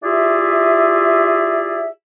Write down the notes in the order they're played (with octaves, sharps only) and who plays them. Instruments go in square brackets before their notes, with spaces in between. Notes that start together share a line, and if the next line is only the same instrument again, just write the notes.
[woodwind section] E4 F4 G4 G#4 D5 E5